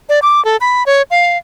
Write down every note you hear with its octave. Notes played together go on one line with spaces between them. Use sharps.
D5
D6
A4
B5
C#5
F5